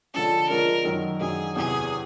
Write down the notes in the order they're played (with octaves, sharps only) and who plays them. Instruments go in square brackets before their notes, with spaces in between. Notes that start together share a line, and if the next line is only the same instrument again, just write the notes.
[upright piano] D3 F3 G#3 C#4 [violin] A4
[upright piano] D3 F3 G#3 C#4 [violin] A#4
[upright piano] F#2 D#3 F#3
[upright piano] F#2 D#3 F#3 [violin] G#4
[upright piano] E2 C3 E3 [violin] G#4